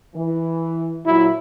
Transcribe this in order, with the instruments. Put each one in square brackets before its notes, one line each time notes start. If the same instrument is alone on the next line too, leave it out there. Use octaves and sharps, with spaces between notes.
[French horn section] E3
[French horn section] A#2 F#3 [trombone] E4